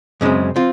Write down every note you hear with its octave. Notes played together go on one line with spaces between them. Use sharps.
F#2 C#3 G#3 C4
C4 F4